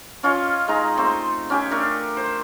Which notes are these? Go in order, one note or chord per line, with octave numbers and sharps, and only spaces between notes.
C#4 F4 C#5 D#5
G#3 D#4 A#5
A3 C4 C5
C#4 G4 G#5
A3 D4 A#4
C5